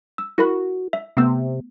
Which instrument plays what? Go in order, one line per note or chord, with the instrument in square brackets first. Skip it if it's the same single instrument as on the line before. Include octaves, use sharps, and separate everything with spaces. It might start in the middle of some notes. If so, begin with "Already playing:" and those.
[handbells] E6
[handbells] E4 A#4 B5 [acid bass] F#4
[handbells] E5
[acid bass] C3 [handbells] A3 B3 E6